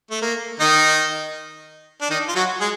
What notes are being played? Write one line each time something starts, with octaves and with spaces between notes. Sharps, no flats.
A3
A#3
D#3 D#4
D4
D#3 D#4
F4
F#3 F#4
G#3 G#4